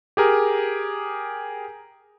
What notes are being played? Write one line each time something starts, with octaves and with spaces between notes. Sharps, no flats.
G4 G#4 A#4